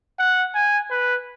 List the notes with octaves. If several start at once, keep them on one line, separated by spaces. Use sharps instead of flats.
F#5
G#5
B4